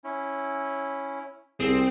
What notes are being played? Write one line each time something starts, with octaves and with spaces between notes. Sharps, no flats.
C#4 E4
C2 C4 G#4